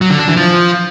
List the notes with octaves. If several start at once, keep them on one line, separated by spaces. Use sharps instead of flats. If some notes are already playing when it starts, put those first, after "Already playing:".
F#3
D3
D4
E3
F3